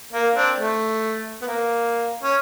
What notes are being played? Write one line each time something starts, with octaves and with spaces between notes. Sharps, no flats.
A#3
C4 D4
A3
B3
A#3
C#4